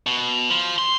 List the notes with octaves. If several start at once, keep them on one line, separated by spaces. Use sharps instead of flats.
B2
F3
C6